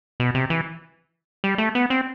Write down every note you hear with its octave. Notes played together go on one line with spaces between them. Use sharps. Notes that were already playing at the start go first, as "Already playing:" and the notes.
B2
C3
E3
G3
A3
B3
C4